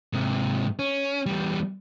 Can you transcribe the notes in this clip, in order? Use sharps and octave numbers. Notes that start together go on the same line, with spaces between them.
G#2 C3
C#4
E2 G3